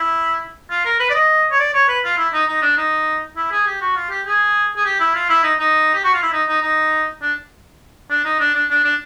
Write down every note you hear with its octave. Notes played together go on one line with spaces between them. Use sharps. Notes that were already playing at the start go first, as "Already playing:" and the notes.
Already playing: E4
F4
A#4
B4
D5
D#5
C#5
D5
C#5
B4
F4
E4
D#4
D#4
D4
D#4
E4
G#4
G4
F#4
F4
G4
G#4
G#4
G4
E4
F4
E4
D#4
D#4
G4
F#4
F4
E4
D#4
D#4
D#4
D4
D4
D#4
D4
D4
D4
D4